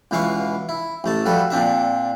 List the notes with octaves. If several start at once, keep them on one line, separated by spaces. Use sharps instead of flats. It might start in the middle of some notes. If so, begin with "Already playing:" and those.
C#2 B2 E3 F5 F#5 C#6
E4
A1 A3 A5
F3 G3 F#4 A4 B4
A#2 C4 D4 E5